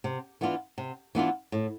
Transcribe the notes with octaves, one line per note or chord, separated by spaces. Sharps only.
C3
E3 B3 D4 F4
C3
E3 B3 D4 F4
A2